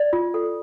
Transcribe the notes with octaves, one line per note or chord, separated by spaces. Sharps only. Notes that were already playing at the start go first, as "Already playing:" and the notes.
Already playing: D5
F4
A4